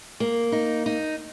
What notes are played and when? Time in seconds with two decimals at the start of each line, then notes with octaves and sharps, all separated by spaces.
0.20 A#3
0.52 D#4
0.86 D#4